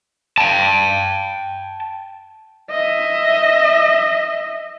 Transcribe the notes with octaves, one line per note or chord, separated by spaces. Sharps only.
G5 A5
D#5 E5